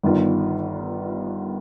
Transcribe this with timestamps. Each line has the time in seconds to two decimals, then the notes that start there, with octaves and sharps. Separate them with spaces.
0.03 G1 G2 D#3 B3 F4